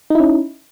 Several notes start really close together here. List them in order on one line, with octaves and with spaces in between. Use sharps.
D#4 E4 C#4